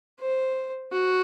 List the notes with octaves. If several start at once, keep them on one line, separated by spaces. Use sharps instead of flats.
C5
F#4